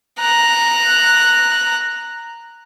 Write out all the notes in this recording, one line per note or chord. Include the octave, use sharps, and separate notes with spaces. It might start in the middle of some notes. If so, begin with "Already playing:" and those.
A#5 F#6